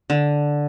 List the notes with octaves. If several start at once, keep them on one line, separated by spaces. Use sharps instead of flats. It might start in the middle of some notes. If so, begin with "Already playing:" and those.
D3